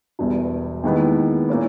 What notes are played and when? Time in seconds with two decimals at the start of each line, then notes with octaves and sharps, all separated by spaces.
0.19 E1 E2 B2 G3
0.84 D#2 D#3 G#3 B3 E4
1.49 A#2 A#3 C#4 E4